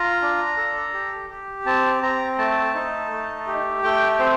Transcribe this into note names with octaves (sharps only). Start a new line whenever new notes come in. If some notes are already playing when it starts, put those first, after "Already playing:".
Already playing: F4 A#5
D4
A4
G4
G4
C4 A5
C4 A#5
A3 A5
D#4
A3
G4
A3 G5
C4 C5